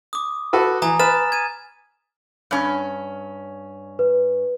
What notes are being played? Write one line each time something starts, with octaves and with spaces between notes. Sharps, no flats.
D6 D#6
F#4 A4 B4
E3 G#5 A#5 D#6
B4 F6 A6 E7
G#6 D#7
G2 C#4
B4